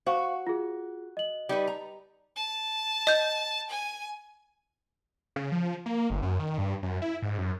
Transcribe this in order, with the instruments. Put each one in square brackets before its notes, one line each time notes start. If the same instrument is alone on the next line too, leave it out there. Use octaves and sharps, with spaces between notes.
[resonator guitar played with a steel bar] F#4 [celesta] C5 F5 C#6
[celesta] F4 G#4
D#5 F#7
[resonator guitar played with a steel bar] G3 D#4 B4
A#5
[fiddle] A5
[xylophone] D#5 G6
[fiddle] G#5
[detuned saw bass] C#3
F3
A#3
G1
F#2
D#3
G2
F#2
E4
G#2
F#2